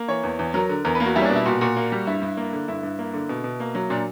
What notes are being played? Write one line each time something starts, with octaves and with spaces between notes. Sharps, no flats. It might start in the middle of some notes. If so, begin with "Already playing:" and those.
Already playing: A#3
E3 C#5
E2
E2
F#3 A#4
D3
E2 A#4
A#3 B4
F#4
G3 E4
C#4
D4
B2 E4
A#2 F#4
A#2 F#4
A#3
G3
G2 E4
G2
A#3
D3
G2 E4
G2
A#3
D3
B2
B2
A#3
F#3
A#2 D4